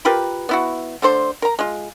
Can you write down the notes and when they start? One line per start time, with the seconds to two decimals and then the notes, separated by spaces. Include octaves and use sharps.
0.05 F4 G4 A#4 B4
0.49 B3 E4 F#4
1.02 D3 A3 C5 C6
1.42 A#4 A#5
1.59 G#3 F4